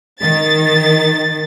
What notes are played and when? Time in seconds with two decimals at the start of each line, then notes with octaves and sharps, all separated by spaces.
0.20 D#3 A6